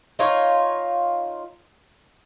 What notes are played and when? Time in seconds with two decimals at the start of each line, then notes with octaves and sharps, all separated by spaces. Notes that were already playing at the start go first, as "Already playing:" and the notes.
0.19 D#4 F4 C#5